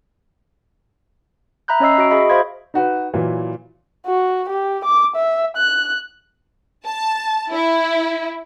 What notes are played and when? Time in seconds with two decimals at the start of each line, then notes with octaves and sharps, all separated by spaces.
1.68 E5 A#5 B5 F#6 G6
1.80 C#4 C#5 D#5 E6 C7
1.98 F#4 D#5 D7
2.11 F#4 G#4 D#5 E5 B5
2.30 C5 D#5 F5 B5 C6 G#6
2.74 D#4 F#4 B4
3.14 A#2 E3 F#3
4.06 F#4
4.49 G4
4.85 D6
5.16 E5
5.57 F#6
6.86 A5
7.52 E4